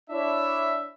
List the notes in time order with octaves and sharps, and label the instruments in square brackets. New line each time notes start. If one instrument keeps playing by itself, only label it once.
[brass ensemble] D4 E4 C#5 E5